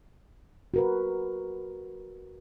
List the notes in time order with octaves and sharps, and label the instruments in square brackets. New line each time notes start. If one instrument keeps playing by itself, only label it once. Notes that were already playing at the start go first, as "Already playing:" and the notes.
[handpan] F#4 A#4 B4